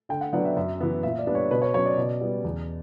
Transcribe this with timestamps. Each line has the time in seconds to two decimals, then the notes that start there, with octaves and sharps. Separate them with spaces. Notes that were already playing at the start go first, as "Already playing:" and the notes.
0.09 D3 G5
0.21 F#5
0.33 F#3 B3 D4 F#5
0.45 E5
0.56 F#2 E5
0.81 E3 B3
1.03 A#2 E5
1.19 D5
1.27 G3 B3 D4
1.35 C#5
1.51 B2 B4
1.62 C#5
1.74 F#3 C#4 C#5
1.86 D5
1.98 B2
2.21 G3 B3
2.44 E2